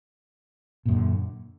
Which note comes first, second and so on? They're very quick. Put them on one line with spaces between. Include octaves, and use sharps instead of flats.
A#2 F#2 D3